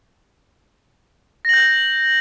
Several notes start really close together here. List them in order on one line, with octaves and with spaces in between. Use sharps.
A#6 F#7 G6